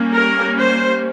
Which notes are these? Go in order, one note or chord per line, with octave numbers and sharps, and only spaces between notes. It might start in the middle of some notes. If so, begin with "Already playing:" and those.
Already playing: G3 A#3 C#4
A#4
C5